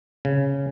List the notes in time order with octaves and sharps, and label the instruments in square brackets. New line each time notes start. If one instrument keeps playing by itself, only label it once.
[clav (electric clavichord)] C#3